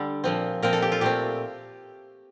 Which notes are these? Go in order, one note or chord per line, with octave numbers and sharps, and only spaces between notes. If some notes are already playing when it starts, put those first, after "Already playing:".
Already playing: D3 G3 A4
A#2 F3 C4
A#2 F3 C4 A#4
A4
G4
F4
A#2 A3 C4 G4